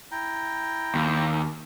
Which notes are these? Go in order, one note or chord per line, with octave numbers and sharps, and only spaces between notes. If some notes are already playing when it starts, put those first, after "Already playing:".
E4 G5 A#5
D#2